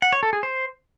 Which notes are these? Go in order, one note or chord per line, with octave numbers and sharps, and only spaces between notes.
F#5
C#5
A4
G#4
C5